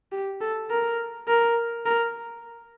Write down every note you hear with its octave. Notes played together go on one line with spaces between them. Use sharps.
G4
A4
A#4
A#4
A#4